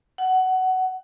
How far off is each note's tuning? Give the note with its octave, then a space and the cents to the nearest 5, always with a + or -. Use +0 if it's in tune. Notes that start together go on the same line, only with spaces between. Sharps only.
F#5 +15